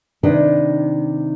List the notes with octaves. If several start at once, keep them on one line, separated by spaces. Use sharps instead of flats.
C3 D#3 D4 B4 D#5